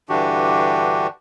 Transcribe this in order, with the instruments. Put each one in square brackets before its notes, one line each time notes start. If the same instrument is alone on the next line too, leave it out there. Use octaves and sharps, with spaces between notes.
[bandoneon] G2 D3 E3 D4 F#4 G4